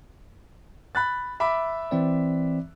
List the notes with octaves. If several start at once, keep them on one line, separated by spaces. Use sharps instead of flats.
B5 F#6 A6
E5 B5 D6
E3 C4 D5